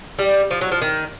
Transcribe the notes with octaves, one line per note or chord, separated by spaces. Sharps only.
G3
F3
F#3
F3
D#3